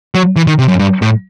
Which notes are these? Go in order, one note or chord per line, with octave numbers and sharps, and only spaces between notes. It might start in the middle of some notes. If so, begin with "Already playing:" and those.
F#3
E3
D#3
C3
F#2
G2
A2